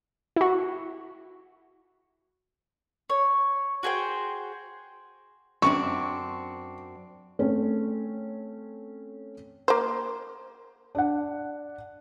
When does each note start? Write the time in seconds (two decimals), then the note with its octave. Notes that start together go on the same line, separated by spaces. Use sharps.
0.36 E4 F#4
3.10 C#5
3.83 F#4 G#4 C5 G5
5.62 F#2 C4 D4 C#6
7.39 A3 C4 C#4
9.68 A#3 C5
10.95 D4 F#5